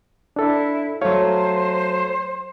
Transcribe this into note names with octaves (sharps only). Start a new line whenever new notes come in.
D4 E4 A4
F#3 A3 C5 C#5 F5